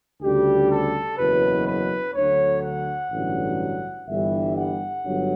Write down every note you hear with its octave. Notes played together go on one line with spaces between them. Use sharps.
D2 C#3 G3 G4
A4
F#1 E2 B2 F#3 B4
B4
D2 D3 F#3 C#5
F#5
A1 G2 D3 F#3
G1 G2 E3 G3 E5
F#5
G1 G2 F#3